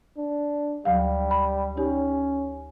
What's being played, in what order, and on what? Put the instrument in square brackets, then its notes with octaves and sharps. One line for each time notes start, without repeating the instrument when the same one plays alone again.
[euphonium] D4
[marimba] D2 F#3 F5 [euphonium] G3
[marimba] B5
[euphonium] C#4 [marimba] D#4 G4